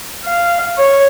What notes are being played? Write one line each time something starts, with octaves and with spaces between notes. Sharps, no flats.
F5
C#5